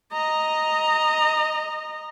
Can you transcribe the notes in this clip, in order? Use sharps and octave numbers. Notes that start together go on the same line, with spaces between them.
D#5 A#5